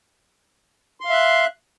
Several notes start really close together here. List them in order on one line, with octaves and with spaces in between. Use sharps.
C6 F5 E5 F#6